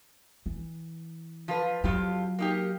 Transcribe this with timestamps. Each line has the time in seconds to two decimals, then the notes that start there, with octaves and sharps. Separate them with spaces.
0.46 E3
1.48 F3 F4 B4
1.84 F2 F#3 F4 G4
2.39 A#3 D#4 G4